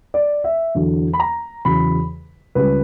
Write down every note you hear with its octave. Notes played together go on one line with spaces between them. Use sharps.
D5
E5
E2 D3 F#3
B5
A#5
E2 C#3 F#3 B5
C#2 C#3 G3 B4